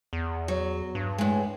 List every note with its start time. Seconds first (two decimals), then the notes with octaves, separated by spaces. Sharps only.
0.13 E2
0.48 F#3
0.95 G2
1.18 A2 G#3